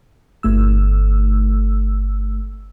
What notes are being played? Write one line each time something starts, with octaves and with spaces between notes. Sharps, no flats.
G1 A3 E6